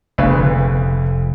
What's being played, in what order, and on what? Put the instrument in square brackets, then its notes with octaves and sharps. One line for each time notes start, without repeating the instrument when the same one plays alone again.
[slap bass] F1 [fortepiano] D2 C#3 B4